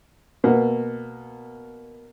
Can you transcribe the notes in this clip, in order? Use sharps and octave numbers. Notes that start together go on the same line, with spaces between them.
B2 A#3 B3